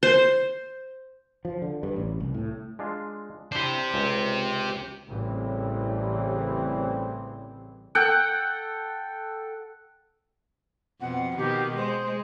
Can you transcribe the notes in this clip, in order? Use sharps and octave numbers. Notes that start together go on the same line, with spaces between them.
C5
F3
D3
G2
A1
C2
A2
G#3 D4 F4
D4 E4 G4 C5
C#2 G#5
A1 A2 C#3 E3 G3 C4
A4 F#5 G5
F2 B2 F#5
B2 D#3 G4
G#3 C5